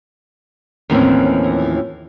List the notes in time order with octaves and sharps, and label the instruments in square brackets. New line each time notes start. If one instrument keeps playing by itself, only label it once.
[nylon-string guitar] D#2 A2 E3 F3 C4 C#4